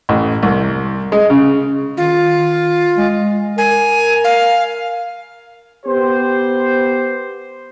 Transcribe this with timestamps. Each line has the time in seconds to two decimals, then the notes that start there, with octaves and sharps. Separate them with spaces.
0.09 A1
0.43 C2
1.12 G#3
1.30 C#3
1.97 D#3 F4
2.35 D#3
2.98 G#3
3.58 A#4 G#5
4.24 F5
5.86 B3 G4 C5